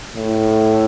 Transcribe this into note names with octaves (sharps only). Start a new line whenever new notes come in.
A2